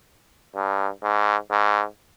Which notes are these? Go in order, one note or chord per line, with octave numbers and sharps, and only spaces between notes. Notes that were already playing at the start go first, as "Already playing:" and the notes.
G2
G#2
G#2